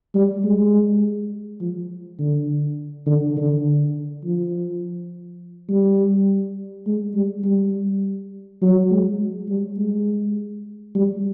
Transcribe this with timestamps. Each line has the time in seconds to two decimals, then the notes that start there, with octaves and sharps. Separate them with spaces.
0.15 G3
0.44 G#3
1.61 F3
2.19 D3
3.07 D3
3.37 D3
4.24 F3
5.69 G3
6.86 G#3
7.15 G3
7.44 G3
8.62 F#3
8.91 G#3
9.49 G3
9.77 G#3
10.95 G3